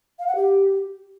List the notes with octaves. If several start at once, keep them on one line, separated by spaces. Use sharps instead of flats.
F5
F#5
G4